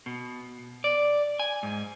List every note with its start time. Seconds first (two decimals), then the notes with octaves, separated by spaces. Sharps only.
0.06 B2
0.84 D5
1.40 G#5
1.63 G#2